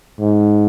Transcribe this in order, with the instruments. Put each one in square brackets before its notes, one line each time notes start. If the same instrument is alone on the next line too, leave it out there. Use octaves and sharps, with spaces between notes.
[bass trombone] G#2